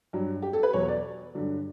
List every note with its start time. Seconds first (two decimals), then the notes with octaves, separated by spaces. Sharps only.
0.13 G2 F#3
0.42 G4
0.53 A4
0.63 B4
0.73 E2 B2 F#3 C#5
0.88 D5
1.35 G2 D3 F#3